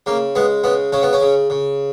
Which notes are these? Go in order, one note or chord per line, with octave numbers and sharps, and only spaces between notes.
C#3 A#3
G#3 B3
C#3 B3
C#3 C#4
B3
C#4
C#3
C#3